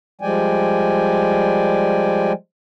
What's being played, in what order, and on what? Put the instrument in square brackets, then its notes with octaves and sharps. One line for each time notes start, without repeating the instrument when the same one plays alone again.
[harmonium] F3 G3 G#3 D5 G5 G#5